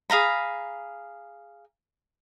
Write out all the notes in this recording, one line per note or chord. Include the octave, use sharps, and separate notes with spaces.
G#4 F5 A#5 B5